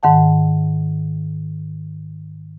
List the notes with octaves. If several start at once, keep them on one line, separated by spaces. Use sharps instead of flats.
G#2 D#3 F#5 A5